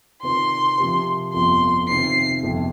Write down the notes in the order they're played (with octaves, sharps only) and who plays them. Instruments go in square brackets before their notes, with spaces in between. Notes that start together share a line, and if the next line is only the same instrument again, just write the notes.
[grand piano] C3 D#3 C4 F4 A#4 [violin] C6
[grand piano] C3 F3 C4 G4 A#4
[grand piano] G1 F2 F3 [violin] C6
[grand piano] C3 D#3 C4 F4 [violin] C7
[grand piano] G1 F2 C3 F3